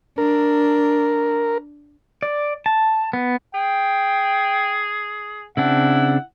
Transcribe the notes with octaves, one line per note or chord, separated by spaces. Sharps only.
D4 A#4
D5
A5
B3
G#4 G5
C#3 C4 D4 E4 F#5